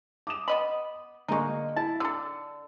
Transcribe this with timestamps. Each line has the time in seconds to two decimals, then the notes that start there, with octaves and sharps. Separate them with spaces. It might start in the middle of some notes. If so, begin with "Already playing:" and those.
0.27 D6 D#6 E7
0.48 B3 D#5 B5
1.28 D3 G#3 A#3 D#4 C#6
1.76 E4 A5
2.00 D3 A4 E6